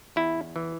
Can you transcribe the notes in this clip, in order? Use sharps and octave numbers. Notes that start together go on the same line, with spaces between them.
E2 E4
E3